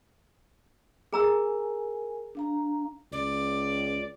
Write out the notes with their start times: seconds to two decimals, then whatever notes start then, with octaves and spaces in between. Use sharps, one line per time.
1.13 G#4 A#4 G#5 A#5 E6
2.35 D4 F5 A#5
3.12 C#2 D5